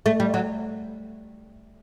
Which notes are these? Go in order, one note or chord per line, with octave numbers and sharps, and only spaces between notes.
A3
G3
F#3